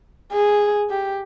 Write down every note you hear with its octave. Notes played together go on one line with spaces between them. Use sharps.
G#4
G4